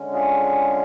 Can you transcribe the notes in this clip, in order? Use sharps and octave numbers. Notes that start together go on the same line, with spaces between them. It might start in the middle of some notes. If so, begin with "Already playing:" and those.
Already playing: D3 G#3 C#4
F4 G#4